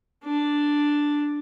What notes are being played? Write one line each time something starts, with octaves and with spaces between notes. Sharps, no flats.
D4